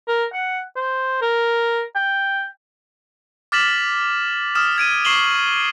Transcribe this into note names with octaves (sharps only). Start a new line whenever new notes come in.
A#4
F#5
C5
A#4
G5
D6 F6 A6 B6 E7 F#7
D#6 F6 E7
F6 G#6 D7 D#7
C#6 C7 E7 F#7 G7